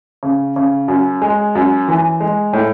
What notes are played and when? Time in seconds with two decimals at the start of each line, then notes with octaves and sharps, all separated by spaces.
0.23 C#3
0.56 C#3
0.88 F#2
1.22 G#3
1.55 F#2
1.88 E3
2.20 G#3
2.53 A2